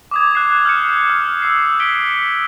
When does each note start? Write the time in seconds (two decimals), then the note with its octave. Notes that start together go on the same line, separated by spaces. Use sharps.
0.11 D6 D#6 G#6
0.35 F#6 C7
0.65 F6 G6 C#7
1.09 F6
1.42 E6 C7
1.80 B6 C#7 D7 G7